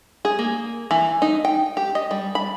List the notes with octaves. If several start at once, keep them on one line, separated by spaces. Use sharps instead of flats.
G#4
A#3
E3
D#4
G5
G4
D#5
G3
B5